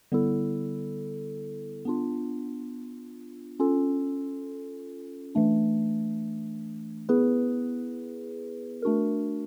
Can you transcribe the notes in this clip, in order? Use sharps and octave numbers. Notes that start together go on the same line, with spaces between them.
D3 G3 B3 E4 A4
B3 D4 F4
C#4 F4 A4
E3 A3 D4
B3 E4 G#4 B4
A3 D4 F#4 A#4